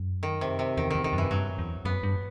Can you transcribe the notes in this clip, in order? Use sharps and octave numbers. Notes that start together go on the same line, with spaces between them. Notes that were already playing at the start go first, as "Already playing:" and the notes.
Already playing: F#2
D#3
C3
C3
E2 D#3
E2 D#3
D#3
F#2 E3
G2 F#3
E2
F#2 B3
G2